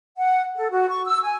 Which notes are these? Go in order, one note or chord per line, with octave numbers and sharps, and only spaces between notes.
F#5
A4
F#4
C#6
E6
G#5